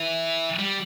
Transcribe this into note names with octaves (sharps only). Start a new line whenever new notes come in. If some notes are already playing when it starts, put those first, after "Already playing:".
Already playing: E3
G3